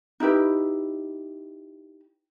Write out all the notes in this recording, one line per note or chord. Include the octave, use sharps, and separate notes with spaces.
D#4 E4 G4 B4